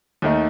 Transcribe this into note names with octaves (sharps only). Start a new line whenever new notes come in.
D#2 D#3 A3 D#4